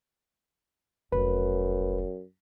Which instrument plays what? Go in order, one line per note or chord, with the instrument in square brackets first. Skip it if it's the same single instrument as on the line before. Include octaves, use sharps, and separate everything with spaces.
[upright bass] F1 B1 [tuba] F#2 [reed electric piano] B4